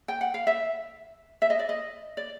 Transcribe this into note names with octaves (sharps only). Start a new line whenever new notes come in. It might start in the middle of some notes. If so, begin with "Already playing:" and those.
G5
F#5
F5
E5
E5
D#5
D5
D#5
D5